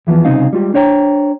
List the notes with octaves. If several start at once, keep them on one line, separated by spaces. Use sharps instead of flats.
E2 E3 F3 B3
C2 C#3 C4 D#4 F5
G3 G#3 F4 G4
D4 C5 C#5 G5 A#5